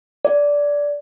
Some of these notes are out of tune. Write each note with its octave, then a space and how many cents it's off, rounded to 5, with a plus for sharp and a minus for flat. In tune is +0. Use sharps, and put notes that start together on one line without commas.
D5 -15